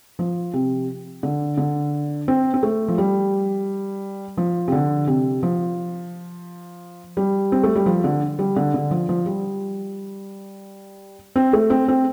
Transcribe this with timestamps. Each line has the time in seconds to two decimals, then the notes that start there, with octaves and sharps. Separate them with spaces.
0.19 F3
0.54 C3
1.23 D3
1.57 D3
2.28 C4
2.54 C4
2.63 A3
2.88 F3
2.98 G3
4.37 F3
4.68 C3
4.72 D3
5.07 C3
5.43 F3
7.17 G3
7.52 C4
7.63 A3
7.76 G3
7.86 F3
8.04 D3
8.39 G3
8.57 D3
8.74 D3
8.91 F3
9.09 F3
9.26 G3
11.36 C4
11.53 A3
11.70 C4
11.88 C4